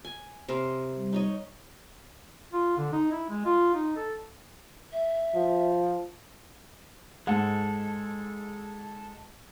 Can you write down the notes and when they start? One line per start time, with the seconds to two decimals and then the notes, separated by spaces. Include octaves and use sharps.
0.05 G#5
0.48 C3 A#4 C5
0.96 G3
1.13 D#4 C#5 D#5
2.53 F4
2.78 D3
2.93 D#4
3.12 E4
3.30 G#3
3.46 F4
3.75 D#4
3.96 A4
4.93 E5
5.35 F3
7.27 G#2 G#3 A4 F#5